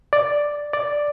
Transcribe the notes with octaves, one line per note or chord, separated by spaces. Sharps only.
D5
D5